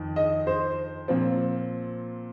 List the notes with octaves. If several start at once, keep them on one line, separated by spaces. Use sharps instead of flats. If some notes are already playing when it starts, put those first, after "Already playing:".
Already playing: F2 D#3
D#5
C5
A#2 F3 C4